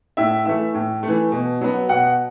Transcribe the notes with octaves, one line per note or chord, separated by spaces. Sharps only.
A2 E5
E3 A3 E5
A2
E3 A3
B2
F#3 B3
B2 F#5